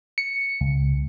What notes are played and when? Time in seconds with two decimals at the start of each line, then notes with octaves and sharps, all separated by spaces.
0.18 C#7
0.61 C#2